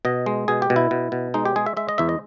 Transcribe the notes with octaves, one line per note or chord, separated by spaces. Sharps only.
B2 D#5
G#3
B2 G#4
G4
B2
E4
B2
B2
G#3 D#4
G4
G#3 G#4
E5
G#3 E5
D#5
E2 E5
D#5